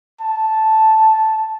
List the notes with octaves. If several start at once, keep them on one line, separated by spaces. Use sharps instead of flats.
A5